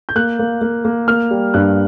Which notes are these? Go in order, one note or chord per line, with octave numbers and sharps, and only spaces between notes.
G6
A#3 F#6
A#3
A#3
A#3
A#3 F6
G3
G2 F#6